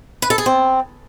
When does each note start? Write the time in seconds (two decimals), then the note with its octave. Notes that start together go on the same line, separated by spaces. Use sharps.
0.22 B4
0.30 A4
0.38 G#4
0.46 C4